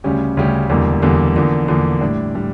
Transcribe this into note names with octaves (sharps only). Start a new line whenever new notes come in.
D2 C#3 G3 C#4 G4
D2 C#3 G3 C#4 G4
E1 E2 D3 G3 A#3
E1 E2 D3 G3 A#3
E2 D3 F3 A#3
E2 D3 F3 A#3
A2 G3 D4
A2 G3 D4